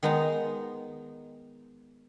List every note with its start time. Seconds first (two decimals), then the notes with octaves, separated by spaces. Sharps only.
0.03 D#3 G#3 B3 D#4 A#5